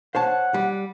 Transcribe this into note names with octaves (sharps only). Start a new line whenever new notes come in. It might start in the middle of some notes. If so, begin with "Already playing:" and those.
C5 C#5 F#5 A5
G3